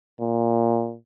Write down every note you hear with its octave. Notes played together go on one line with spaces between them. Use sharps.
A#2